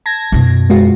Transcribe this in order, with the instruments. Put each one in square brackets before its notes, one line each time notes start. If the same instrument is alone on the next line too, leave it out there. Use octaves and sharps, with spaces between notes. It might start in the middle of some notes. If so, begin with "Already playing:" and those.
[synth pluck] A5 G#6 A#6
[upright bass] F#2 B2
[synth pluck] G#3 F4 F#4